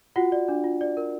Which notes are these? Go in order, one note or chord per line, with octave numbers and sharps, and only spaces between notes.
F4 F#4 F#5
D5
D4
F4
D5
A#4